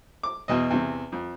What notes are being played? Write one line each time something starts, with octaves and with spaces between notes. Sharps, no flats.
D6
E2 B2 D#5
E2 C3
F2